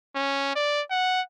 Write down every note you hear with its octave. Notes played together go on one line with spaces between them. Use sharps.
C#4
D5
F#5